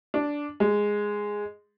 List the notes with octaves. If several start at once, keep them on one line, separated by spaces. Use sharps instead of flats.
D4
G#3